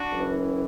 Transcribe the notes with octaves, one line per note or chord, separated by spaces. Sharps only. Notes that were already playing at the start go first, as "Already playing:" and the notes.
Already playing: D4 F#4
F#1 F#2 E3